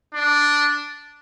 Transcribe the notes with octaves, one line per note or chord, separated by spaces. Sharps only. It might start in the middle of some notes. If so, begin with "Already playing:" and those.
D4